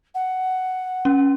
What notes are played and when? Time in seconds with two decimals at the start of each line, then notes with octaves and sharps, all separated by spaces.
0.15 F#5
1.05 C#4